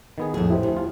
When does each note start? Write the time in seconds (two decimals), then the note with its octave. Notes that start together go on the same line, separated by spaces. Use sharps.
0.18 D#3 B3 G#4
0.34 A#1 F2 A2 G#4
0.50 E4 G4 C5
0.63 D2
0.77 F4